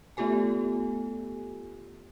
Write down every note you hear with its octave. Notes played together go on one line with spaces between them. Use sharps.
A3 B3 F4 G4 A4 G#5